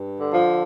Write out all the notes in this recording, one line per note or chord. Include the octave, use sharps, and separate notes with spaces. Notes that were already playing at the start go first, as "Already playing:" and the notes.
Already playing: G2
D3
F3